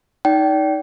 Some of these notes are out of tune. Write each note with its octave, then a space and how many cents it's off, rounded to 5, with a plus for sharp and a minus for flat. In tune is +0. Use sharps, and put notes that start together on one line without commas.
D#4 +10 D5 -30 G5 -25